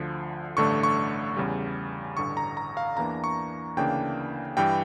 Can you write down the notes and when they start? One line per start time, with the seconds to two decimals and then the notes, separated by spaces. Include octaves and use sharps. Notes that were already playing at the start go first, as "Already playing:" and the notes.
Already playing: D2 D3 F3
0.57 A1 G2 D3 A3 D4 C#6
0.83 C#6
1.37 E2 C#3 G3
2.17 A1 G2 D3 C#6
2.37 A#5
2.57 A#5
2.77 F5
2.97 E2 E3 A#3 D4 A#5
3.24 C#6
3.77 D2 C#3 E3 A#3 D4 G5
4.57 G2 E3 G3 G5